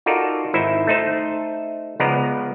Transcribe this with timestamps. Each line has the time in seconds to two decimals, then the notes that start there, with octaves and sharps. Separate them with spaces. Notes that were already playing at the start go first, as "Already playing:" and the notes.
0.06 D#4 F4 F#4 A4 A#4 D5
0.54 G#1 D#4 E4 C5 E5
0.87 A3 D#4 C5
2.00 C#2 F3 G#3 B3 D5 A#5